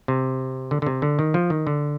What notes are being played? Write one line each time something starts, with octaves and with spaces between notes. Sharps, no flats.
C3
D3
D3
C3
D3
D#3
F3
D#3
D3